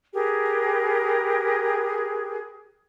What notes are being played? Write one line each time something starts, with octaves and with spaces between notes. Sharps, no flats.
G4 G#4 A#4 B4